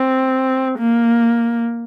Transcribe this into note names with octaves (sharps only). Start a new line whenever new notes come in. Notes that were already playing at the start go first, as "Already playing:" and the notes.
Already playing: C4
A#3